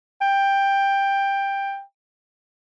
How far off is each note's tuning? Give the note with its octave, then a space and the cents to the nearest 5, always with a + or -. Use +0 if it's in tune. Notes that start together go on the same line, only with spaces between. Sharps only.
G5 +10